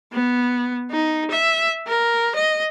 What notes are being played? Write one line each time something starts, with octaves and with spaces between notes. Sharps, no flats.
B3
D#4
E5
A#4
D#5